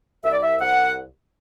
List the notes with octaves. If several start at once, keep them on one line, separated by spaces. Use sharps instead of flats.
C2 E5
D5
E5
C2 F#5